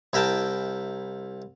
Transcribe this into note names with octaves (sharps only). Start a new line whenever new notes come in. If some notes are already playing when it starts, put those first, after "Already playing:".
C2 E4 A#4 G5 A5